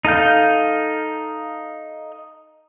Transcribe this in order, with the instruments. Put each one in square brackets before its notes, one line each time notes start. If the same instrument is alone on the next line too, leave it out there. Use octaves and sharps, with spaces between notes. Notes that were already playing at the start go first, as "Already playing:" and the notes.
[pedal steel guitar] D#4 A4 F5 G6